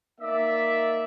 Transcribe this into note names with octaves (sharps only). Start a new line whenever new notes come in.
A#3 D#4 D5 E5